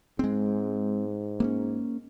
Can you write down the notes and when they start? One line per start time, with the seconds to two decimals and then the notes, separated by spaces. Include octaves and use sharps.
0.19 G#2 G#3 C4
1.40 A#3 B3 C#4